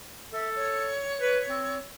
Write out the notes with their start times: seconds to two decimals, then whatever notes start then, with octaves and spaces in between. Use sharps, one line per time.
0.33 A4 E5
0.55 C#5
1.21 B4
1.48 C4